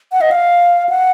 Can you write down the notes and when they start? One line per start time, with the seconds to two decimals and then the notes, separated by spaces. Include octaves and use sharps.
0.12 F#5
0.21 D#5
0.31 F5
0.89 F#5